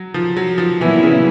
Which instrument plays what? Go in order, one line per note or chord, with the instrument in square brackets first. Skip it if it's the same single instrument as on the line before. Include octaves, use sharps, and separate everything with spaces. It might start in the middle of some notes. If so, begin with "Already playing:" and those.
Already playing: [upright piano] F#3
F3
F#3
F3
[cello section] A#2 F#3 B3 E4 [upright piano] E3
[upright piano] C#3